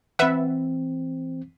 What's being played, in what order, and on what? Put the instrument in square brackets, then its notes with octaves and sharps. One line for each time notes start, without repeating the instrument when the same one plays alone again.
[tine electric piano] E3 C4 [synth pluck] B4 E5 F#5